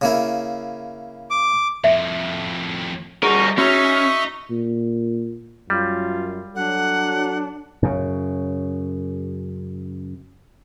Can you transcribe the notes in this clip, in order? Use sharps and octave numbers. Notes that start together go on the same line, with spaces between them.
C#3 A#3 E4
D6
F2 A2 E5
G3 D#4 F#4 G#4 A#4
C#4 D#4 F#4 E5 C#6
A#2
F#2 G3 F4
F#3 D4 A4 F#5
F#2 C#3